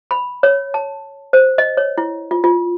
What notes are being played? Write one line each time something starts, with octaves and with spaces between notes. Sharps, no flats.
B5
C#5
A5
C5
D#5
C#5
E4
F4
F4